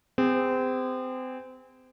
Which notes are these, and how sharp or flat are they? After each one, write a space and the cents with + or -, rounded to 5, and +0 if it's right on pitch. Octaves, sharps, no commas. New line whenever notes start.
C4 -30 G#4 -40